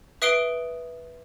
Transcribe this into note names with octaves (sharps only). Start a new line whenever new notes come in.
B4 E5 D#6 C7 D7 G7